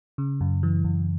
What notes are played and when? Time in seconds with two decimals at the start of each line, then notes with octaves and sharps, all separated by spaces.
0.18 C#3
0.41 F#2
0.63 E3
0.84 F#2